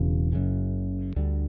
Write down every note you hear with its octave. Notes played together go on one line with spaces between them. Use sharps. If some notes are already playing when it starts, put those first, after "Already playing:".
Already playing: E1 E2 C#3
F#1 F#2 C#3
D2 D3 G3